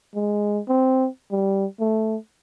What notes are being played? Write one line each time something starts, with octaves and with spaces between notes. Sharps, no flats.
G#3
C4
G3
A3